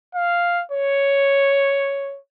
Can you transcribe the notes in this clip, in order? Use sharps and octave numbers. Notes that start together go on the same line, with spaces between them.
F5
C#5